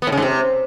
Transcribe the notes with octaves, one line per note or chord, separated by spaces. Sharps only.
B3
A2
C#3
G#2
C3